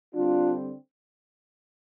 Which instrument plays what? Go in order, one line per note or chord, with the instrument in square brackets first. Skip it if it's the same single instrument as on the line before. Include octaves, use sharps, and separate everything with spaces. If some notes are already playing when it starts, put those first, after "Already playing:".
[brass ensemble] D3 G3 C4 D4 F4